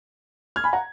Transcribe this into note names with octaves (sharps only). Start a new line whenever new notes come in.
F6 G#6
G#5 B5
F#5 A#5